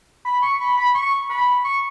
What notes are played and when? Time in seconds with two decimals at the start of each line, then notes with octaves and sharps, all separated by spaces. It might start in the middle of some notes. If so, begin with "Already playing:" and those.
0.25 B5
0.42 C#6
0.60 B5
0.77 B5
0.95 C#6
1.30 B5
1.64 C#6